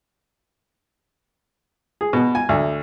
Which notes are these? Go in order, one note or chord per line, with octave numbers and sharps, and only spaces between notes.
G#4
B2
G#5
D2